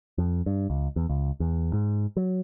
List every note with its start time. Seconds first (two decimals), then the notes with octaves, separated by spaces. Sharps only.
0.18 F2
0.46 G2
0.70 C#2
0.96 E2
1.09 C#2
1.40 E2
1.73 G#2
2.17 F#3